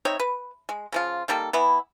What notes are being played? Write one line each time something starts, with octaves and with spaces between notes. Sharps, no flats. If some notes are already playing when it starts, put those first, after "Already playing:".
C4 D#4 C#5 E5
B4
G#3
C#3 F3 F4
D#3 G3 A#3 A4
E3 B3 E4